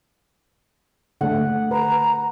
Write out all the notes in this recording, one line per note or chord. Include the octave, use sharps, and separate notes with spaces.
D3 A3 F#5
B4 A#5